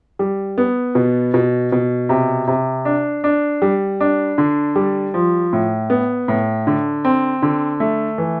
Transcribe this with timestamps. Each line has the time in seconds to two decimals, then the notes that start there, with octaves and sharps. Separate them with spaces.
0.19 G3
0.58 B3
0.95 B2
1.34 B2
1.72 B2
2.09 C3
2.48 C3
2.85 D4
3.24 D4
3.62 G3
4.00 D4
4.38 D3
4.76 G3
5.14 F3
5.53 A2
5.90 B3
6.28 A2
6.67 D3
7.05 C4
7.42 D3
7.80 A3
8.18 E3